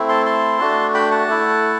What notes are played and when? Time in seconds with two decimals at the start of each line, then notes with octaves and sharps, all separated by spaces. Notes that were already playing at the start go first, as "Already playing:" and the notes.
Already playing: A3 C4 E4
0.09 A5 C6
0.26 A5 C6
0.60 A3 D4 F#4
0.94 G5 B5
1.11 F#5 A5
1.28 A3 E4